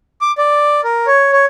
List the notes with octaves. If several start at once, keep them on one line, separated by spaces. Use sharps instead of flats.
D6
D5
A#4
C#5
C#5